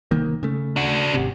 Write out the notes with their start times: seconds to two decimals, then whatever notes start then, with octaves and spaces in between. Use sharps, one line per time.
0.11 C2 D#3 A#3
0.43 C#3 A3
0.76 D4 F#4
1.14 G#1 C3